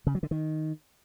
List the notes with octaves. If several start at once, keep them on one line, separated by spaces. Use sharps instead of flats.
C#3
F#3
D3
D#3